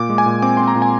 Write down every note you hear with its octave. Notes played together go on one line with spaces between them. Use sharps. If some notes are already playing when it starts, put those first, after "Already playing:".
Already playing: A#2 D6
G#3
G#5
A#2
C4 D6
C4 C6
A#5
A#2
G#5